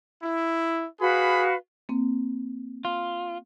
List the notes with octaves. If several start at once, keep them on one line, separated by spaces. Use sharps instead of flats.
E4
F#4 G#4 B4 F5 B5
A#3 C4
F4